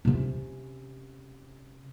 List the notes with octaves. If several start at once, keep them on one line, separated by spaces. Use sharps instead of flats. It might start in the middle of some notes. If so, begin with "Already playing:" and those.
C3 C#4